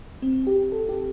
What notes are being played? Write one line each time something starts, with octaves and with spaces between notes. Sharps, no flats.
C4
G4
A4
G4